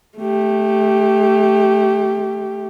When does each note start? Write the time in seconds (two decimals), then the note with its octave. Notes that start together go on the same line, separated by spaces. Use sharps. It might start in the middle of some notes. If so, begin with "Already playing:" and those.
0.18 A3 G4